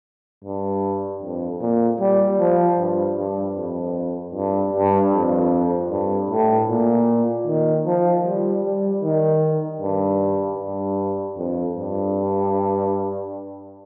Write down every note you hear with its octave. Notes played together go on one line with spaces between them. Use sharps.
G2
F2
A#2
G3
F3
G2
G2
F2
G2
G2
F2
G2
A2
A#2
D#3
F3
G3
G3
D#3
G2
G2
F2
G2